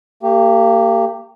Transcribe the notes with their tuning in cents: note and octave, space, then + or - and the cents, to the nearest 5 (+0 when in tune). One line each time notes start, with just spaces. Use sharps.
A#3 -35 G4 +0